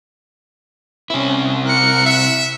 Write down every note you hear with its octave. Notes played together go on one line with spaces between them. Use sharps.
C3 C#4 E4
A#4 F#6 C#7
E5